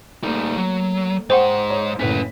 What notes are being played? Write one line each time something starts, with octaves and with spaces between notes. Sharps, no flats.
G3 A3 A#3 D#4
F#3
G#2 C5 F#5 G5 C6 C#6
C#5
F#1 A2 C#4 B4 B6